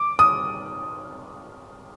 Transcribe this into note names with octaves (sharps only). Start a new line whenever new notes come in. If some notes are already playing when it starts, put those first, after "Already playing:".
Already playing: D6
D#6